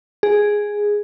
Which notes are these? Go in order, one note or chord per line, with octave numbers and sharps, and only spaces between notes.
G#4